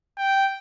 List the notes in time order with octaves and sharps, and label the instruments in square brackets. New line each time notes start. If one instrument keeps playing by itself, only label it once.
[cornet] G5